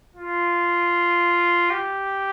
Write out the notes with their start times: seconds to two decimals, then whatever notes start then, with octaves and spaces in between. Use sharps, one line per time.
0.16 F4
1.70 G4